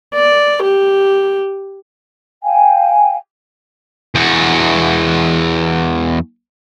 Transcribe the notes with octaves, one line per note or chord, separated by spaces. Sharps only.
D5
G4
F5 G5 G#5
E2 F#4